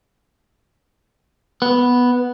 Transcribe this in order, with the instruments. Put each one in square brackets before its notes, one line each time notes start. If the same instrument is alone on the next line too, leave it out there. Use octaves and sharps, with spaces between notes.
[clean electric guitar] B3